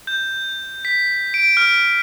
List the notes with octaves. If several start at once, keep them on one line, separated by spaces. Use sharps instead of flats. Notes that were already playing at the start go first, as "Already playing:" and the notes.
G6
B6
D7
F6